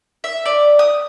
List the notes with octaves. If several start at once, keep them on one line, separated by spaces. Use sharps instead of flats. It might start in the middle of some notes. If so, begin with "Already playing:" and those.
E5
D5
D#6